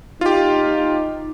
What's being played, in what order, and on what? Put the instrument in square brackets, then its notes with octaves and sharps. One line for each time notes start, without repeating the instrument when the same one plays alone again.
[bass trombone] D#4 [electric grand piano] F4 G4